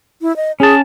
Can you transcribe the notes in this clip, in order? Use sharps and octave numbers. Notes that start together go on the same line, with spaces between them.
E4
D#5
C#4 G#4 A5